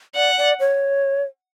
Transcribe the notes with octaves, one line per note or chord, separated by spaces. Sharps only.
D5 F#5
D5
C#5